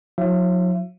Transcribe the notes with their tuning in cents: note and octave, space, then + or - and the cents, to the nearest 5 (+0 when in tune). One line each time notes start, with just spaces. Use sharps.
F#3 -40 E4 -40 E5 +35